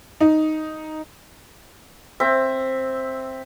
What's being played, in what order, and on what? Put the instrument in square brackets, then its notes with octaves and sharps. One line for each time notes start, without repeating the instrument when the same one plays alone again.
[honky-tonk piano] D#4
[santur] C4 E5